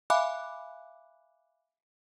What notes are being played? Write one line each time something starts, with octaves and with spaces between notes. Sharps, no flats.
E5 F5 G#5 B5 D6 F#6